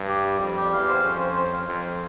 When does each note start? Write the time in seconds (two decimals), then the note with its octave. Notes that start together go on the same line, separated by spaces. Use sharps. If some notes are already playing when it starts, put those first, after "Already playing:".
Already playing: G2
0.08 G4
0.24 G3
0.41 F2 G3
0.56 G4
0.73 E2 F5
0.89 C5
1.04 F2 C#4
1.20 C5
1.37 C5
1.53 F5
1.68 F2 C5
1.85 C5